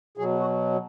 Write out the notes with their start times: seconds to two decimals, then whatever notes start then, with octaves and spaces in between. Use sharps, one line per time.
0.17 B2 F#3 G#4
0.40 F#4